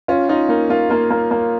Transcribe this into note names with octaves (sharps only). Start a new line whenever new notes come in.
C#4 F4
D#4 F4
A#3 D#4
A#3 F4
A#3 F4
A#3
A#3